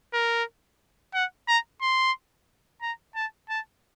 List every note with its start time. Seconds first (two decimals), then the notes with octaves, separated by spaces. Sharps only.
0.13 A#4
1.14 F#5
1.48 A#5
1.81 C6
2.82 A#5
3.16 A5
3.49 A5